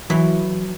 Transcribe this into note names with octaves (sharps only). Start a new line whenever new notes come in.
E3 F#3